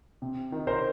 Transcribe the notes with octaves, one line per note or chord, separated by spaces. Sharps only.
C3
D#3
A#4 C5